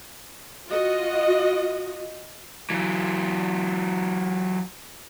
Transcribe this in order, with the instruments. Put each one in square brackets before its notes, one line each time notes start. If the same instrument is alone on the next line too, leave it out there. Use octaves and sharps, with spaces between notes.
[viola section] F4 F#4 D#5
[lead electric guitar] E3 F#3